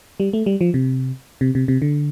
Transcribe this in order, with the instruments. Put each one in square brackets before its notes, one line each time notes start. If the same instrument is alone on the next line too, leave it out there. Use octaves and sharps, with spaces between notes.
[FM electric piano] G3
A3
G3
F3
C3
C3
C3
C3
D3